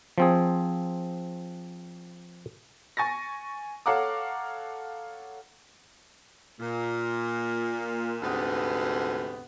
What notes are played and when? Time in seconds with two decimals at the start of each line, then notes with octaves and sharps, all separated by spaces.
0.18 F3 C4 G#4
2.97 G#5 C#6 A6 A#6
3.86 A4 C#5 F5 F#5 A#5 D6
6.60 A#2
8.21 D2 G#2 C3 B3